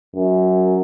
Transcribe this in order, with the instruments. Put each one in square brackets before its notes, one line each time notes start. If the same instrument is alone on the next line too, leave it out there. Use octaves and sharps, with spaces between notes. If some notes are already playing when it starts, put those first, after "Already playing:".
[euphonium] F#2